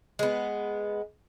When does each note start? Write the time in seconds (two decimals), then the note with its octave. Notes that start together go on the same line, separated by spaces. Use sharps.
0.19 G#3 B3